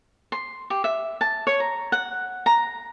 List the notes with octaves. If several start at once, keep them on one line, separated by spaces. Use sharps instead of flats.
C6
G4
E5
A5
C#5
A#5
F#5
A#5